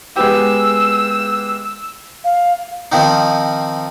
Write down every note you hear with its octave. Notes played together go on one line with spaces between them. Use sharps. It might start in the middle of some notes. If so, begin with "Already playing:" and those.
G#3 B3 G4 E6
F5
D#3 F3 C4 D#4